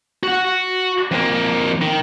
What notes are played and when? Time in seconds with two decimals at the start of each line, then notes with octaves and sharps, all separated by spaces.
0.23 F#4 F#5
1.11 F2 A#3
1.81 D#3